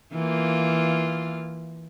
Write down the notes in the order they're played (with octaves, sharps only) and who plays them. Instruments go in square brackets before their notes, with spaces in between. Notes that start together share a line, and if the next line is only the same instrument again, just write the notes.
[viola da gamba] E3 A#3 F4